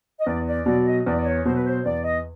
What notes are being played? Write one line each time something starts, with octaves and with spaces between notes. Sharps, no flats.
D#5
E2 D5
D5
B2 F#3 D5
D#5
E2 D5
D5
C#5
B2 F#3 C5
B4
C5
E2 D5
D#5